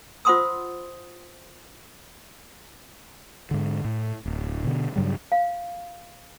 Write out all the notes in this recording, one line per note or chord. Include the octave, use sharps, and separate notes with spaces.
F4 C5 F#5 C6 D#6 E6
G#2 D3
A2
D1
B2 D3 B3
G2 C#3 F#3 G3
F5